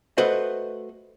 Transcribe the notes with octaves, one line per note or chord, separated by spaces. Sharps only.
A3 F#4 B4 C5 D#5